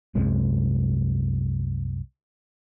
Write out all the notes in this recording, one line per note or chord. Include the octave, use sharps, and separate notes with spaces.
C2 F#2 C3 G#3